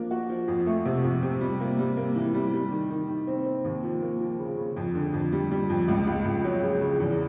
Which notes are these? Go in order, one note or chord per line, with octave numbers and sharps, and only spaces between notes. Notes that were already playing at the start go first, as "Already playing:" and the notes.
Already playing: F3 A#3 D4
F#4
F3
F2
A3
C3
F2
C3
G3
A#3
G3
A#3
E3
G3
G3
D#3
D#3
D#3
C4
C4
D#2
F3
A#3
F3
C#3
C#3
F2
D3
F2
G3
G3
F2
C#2
C#2
C#2
F#3
C#3
C#3
E2